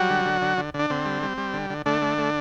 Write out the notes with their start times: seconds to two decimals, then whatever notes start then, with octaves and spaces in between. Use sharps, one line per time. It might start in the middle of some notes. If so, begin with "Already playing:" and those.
Already playing: F#3 G3 F#4
0.10 D3
0.25 D3
0.42 D3
0.58 D3
0.74 D3 D4
0.90 D3 C4
1.05 G3
1.23 G3
1.38 G3
1.53 D3
1.70 D3
1.86 D3 A3 D4
2.02 A3
2.18 A3